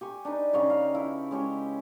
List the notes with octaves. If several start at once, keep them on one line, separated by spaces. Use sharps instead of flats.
G4 G#5 C#6
D4 D#4 B4
C#3 D#4 C#5 G5
F5
E4
G#3 C#4 G4 C#5